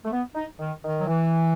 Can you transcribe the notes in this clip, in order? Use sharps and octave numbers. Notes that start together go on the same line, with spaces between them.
A3
B3
D#4
D#3
D#3
F#3
E3